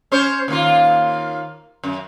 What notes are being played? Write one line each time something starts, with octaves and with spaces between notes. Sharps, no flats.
C#4 C5 C#5
D#2 A#3 F4
F#2